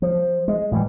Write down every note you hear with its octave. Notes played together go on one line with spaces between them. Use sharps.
F3
G#3
A2 E3 G3